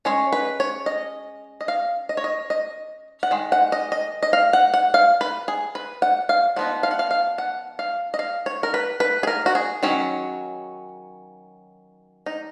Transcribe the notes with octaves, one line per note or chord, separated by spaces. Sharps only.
G#3 C#4 C#5
B4
C#5
D#5
D#5
F5
D#5
C#5
D#5
D#5
F#5
D#3 G#3
F#5
D#5
D#5
D#5
F5
F#5
F#5
F5
B4
G#4
B4
F#5
F5
F3 B3 D#4 F#5
F5
F#5
F5
F5
F#5
F5
D#5
F5
C#5
A#4
B4
B4
G#4
A#4
F#4
G#4
D#3 F#3 C#4
D#4